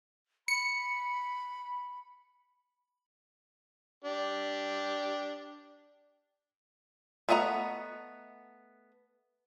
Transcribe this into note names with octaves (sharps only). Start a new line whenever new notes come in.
B5 C#7
D4 G4
A3 B3 D#5 F#5 A#5